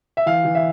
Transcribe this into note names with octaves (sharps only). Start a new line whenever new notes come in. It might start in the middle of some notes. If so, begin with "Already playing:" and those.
E5
E3 F5
E3
E5